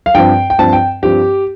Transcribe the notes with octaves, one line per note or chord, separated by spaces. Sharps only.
F5
G2 F3 C4 G5
G5
G2 F3 C4 A5
G5
G2 F3 C4 G4